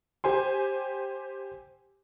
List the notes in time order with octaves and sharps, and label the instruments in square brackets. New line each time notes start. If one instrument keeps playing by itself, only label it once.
[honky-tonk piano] G4 C5 G#5 C6